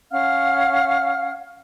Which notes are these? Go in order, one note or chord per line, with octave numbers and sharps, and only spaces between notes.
C#4 F5 F#5 F6